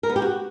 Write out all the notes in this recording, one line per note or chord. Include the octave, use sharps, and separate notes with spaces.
A#4
B3
G4
F#4